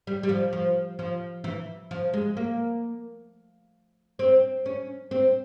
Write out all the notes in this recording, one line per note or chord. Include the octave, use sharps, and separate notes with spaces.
G3
G3
F3
F3
F3
E3
F3
G#3
A#3
C4
C#4
C4